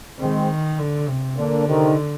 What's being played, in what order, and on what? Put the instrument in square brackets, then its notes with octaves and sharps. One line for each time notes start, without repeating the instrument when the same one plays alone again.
[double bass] D#3 [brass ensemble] G#3 C4
[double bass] D3
C3
[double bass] D3 [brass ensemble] A#3 D4
[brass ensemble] C3 D#3